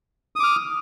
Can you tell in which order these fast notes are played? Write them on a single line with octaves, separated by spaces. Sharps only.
D#6 D6 F6